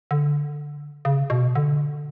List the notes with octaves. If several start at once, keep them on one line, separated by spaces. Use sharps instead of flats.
D3
C#3
B2
D3